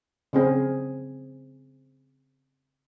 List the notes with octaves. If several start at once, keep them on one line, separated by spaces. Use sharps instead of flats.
C#3 C4 G#4